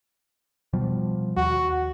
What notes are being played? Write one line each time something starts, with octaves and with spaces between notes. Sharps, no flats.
B2 F3 G3
D#2 F#4